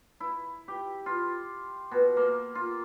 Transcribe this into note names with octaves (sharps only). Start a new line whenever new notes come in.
E4
G4
F4
B2
A#3
F4